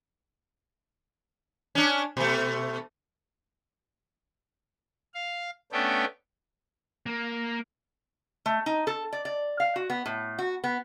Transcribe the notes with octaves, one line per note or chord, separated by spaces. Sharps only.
C#4 D4
B2 A3
F5
A3 B3 C#4 D4 G5
A#3
A3
D#4
A4
D5
D5
F5
F#4
B3
A2
F#4
B3